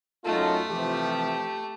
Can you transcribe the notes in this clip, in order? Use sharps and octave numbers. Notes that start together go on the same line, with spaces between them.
F#2 A3 D#4 F4 A4
C3 E3 F3 G4